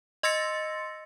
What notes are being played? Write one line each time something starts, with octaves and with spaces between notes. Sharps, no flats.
D#5 C6 E6 A6 A#6 C#7